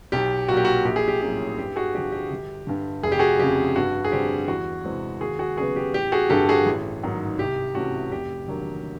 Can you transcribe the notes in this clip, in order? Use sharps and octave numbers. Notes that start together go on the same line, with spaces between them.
B1 G4
A#2 F#3 A#3 F#4
G4
F#4
A#1 G4
G#4
G4
A2 F#3 A#3 C#4 G4
G2 G4
F#4 G#4
D3 F3 G4
G4
G1
G2 D3
F1 G#4
G4
F#4 G#4
F2 C#3 G4
G2 F#4
G#4
D3 G3 C4 G4
E2 F#4
C3 E3 G#3 C4
D#2 F#4 G#4
F#4 G#4
C#3 F#3 B3 F#4 G#4
G4
A1 G4
F#4 G#4
G2 D3 G4 A4
F#4 G#4
A1
G#2 D#3 F#3
C2 G4
C3 E3 A3 C#4 F#4
F1 G4
D#2 D3 F#3 A#3